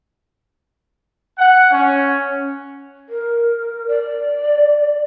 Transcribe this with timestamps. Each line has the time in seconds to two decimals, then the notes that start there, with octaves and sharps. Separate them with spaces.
1.38 F#5
1.71 C#4
3.09 A#4
3.88 D5